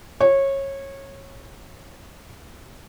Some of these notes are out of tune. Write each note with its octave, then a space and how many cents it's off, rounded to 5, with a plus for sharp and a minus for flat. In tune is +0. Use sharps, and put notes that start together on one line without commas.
C#5 -20